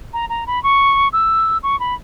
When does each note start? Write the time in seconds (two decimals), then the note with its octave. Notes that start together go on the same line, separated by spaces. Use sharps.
0.13 A#5
0.29 A#5
0.47 B5
0.63 C#6
1.13 E6
1.63 C#6
1.80 B5